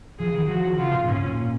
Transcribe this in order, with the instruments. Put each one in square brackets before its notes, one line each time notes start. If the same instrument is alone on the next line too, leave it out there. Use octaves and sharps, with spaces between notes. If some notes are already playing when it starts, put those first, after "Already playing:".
[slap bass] F3 [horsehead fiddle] G#4
[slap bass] D#3
[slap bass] F3 [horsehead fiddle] F#4
[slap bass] C#3 [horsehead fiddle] F4
[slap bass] A#2
[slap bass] G#2 [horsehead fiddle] C#4
[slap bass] A#2